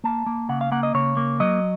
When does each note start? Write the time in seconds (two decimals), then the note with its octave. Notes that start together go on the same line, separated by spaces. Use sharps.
0.04 A#3 A5
0.26 A#3
0.49 C#3 F#5
0.61 F5
0.72 A#3 F#5
0.83 D#5
0.94 C#3 C#5
1.17 A#3
1.40 F#3 D#5